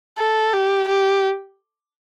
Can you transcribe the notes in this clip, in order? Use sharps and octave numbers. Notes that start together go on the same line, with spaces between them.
A4
G4
G4